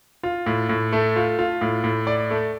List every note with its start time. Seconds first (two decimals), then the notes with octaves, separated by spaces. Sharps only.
0.23 F4
0.46 A2
0.69 A2
0.93 A3
1.16 F4
1.39 F4
1.61 A2
1.84 A2
2.07 D5
2.31 A3